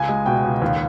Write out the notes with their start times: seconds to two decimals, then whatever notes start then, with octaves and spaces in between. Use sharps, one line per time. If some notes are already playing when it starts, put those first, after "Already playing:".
Already playing: C#2 G#5
0.09 G#3
0.26 B2 G5
0.45 C#2
0.62 D#2